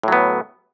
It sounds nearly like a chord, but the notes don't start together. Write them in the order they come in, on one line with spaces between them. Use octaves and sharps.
A2 F#3 B3